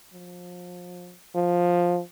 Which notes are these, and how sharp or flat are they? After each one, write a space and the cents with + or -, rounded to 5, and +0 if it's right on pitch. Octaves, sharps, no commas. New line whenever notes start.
F3 +30
F3 +10